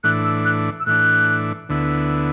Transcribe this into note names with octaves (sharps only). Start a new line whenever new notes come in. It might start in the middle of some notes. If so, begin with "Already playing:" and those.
A2 E3 D4 F#6
E6
F#6
E6
A2 E3 D4 F#6
D2 D3 B3 E4